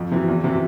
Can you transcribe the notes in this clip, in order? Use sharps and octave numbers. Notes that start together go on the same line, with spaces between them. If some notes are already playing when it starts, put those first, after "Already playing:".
Already playing: F2
C3 E3
E2
C3 E3